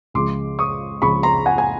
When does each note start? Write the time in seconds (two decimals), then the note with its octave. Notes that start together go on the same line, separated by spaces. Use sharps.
0.14 C#2 C#3 F3 G#3 C6 D6
0.59 C#6 D#6
1.02 C#2 C#3 F3 G#3 B5 C#6
1.23 A#5 C6
1.46 F#5 G#5
1.58 G#5